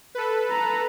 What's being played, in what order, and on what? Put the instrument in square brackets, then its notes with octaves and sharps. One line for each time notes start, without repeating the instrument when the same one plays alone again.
[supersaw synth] A4 B4
[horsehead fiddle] A#5